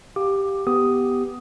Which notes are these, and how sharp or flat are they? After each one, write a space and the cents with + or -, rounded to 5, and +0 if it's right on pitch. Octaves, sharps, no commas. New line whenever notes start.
G4 +0 F5 +25 D6 +15
B3 +0 G4 +0 D#6 +5